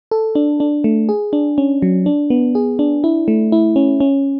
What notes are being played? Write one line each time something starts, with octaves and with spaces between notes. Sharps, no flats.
A4
D4
D4
A3
G#4
D4
C#4
F#3
D4
B3
G#4
D4
E4
A3
E4
C#4
C#4